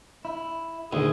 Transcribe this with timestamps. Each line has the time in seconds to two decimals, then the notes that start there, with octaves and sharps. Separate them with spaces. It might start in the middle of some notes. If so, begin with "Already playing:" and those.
0.25 E4
0.93 D2 A#2 D#3 G#4